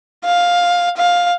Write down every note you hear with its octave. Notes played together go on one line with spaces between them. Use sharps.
F5
F5